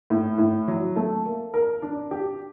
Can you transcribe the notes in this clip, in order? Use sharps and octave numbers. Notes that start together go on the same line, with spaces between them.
A2
A2
F#3
A3
A#3
A#4
D4
G4